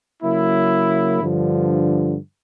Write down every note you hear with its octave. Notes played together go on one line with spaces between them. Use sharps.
C#3 F#3 A#3 E4
G2 D3 F3